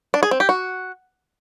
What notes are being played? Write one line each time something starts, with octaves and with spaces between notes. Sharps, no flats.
D4
G#4
C4
G4
F#4